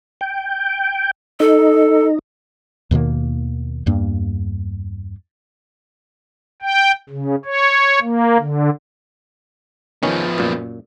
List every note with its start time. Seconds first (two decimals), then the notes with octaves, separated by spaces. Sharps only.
0.21 G5
1.40 D#4 A4
2.91 D#2 B2 D#3 A#3
3.86 E2 G2 A#3
6.62 G5
7.09 C#3
7.45 C#5
8.01 A#3
8.38 D3
10.03 D#3 F3 B3 C#4
10.38 F#2 A#2